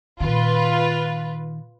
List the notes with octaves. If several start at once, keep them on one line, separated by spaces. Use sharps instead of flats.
A#2 D#3 F4 B4